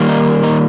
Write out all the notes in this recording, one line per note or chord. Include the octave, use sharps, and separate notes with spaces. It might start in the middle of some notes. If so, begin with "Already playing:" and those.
Already playing: D#3 G3 A#3
D#4
D#4